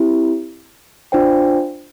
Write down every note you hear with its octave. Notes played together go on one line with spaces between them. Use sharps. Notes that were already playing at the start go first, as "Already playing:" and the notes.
Already playing: C4 E4 G4
D4 F4 C5 G5